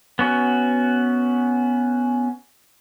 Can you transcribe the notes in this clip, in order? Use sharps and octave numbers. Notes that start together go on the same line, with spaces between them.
B3 C#4 F#4